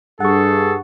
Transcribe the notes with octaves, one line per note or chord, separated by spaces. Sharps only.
G2 G#4 A4 F#5 C#6